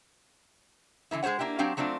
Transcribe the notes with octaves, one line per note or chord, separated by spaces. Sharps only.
D3 E3 B3 E4
G#3 G#4 C5 C#5 F#5
A#3 D4 E4 G4
F#3 C4 D4 G4 D5 F5
F#3 A3 C4 D4 F4